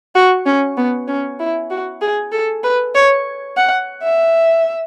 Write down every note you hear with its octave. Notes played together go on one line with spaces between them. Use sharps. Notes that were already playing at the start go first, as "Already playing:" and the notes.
F#4
C#4
B3
C#4
E4
F#4
G#4
A4
B4
C#5
F#5
E5